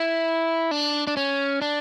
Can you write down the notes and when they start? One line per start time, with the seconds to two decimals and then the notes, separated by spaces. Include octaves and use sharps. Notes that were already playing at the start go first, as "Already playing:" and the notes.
Already playing: E4
0.71 D4
1.07 D4
1.17 C#4
1.62 D4